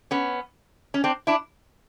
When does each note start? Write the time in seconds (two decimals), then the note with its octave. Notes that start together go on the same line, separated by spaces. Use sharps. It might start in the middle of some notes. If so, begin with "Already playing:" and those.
0.11 B3 C#4
0.94 C#4
1.04 C4 D4
1.27 D4 E4